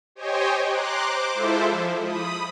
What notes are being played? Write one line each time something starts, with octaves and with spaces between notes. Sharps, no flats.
G4 C5 C#5 D#5 G5 G#5
A#5 C6 D6 F#6
C5 D6
G#3 E4 F4 A4 C5 E5
F3
B5 D#6